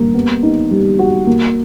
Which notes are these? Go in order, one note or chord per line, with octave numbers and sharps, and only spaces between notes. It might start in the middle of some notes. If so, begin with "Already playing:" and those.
Already playing: G2 A#3
B3
D#4
G3
F#4
A#3